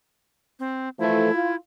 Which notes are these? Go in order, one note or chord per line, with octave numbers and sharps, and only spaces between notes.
C4
E3 F3 A3 E4
F4